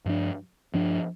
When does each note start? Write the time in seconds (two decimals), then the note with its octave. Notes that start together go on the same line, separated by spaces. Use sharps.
0.06 G2 F3 D4
0.74 G2 F3 D4